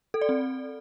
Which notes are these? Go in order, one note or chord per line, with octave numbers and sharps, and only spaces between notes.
A4
D5
C4